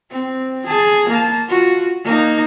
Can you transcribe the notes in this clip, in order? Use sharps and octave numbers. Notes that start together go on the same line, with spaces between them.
C4
G#4 A5
A#3 A5
F4 F#4
A#3 D#4